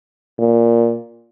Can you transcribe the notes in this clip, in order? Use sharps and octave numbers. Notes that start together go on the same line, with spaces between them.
A#2